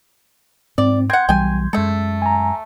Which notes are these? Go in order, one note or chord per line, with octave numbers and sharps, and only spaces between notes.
G#2 C4 D5
C4 F#5 C6 G6 G#6
B1 E3 G3 G5 G#5
F#2 G#3 A3 A4
G#5 A#5